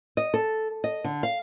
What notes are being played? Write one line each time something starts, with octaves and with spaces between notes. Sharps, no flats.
D#5
A4
D#5
D3
F5